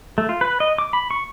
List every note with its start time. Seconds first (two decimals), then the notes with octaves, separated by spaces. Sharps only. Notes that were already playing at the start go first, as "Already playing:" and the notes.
0.18 A3
0.29 F4
0.41 B4
0.60 D#5
0.78 D6
0.93 B5
1.11 C#6